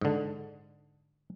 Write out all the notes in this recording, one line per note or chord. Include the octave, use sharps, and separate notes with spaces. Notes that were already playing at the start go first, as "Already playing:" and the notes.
G#2 D3